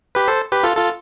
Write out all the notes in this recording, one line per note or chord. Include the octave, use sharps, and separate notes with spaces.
G4 B4
A4 C5
G4 B4
F4 A4
F4 A4